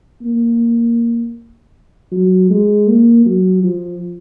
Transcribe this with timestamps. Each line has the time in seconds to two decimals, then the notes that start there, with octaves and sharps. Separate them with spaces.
0.22 A#3
2.12 F#3
2.50 G#3
2.88 A#3
3.25 F#3
3.63 F3